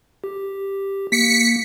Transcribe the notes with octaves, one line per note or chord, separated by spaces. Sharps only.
G4
A#3 B6 C#7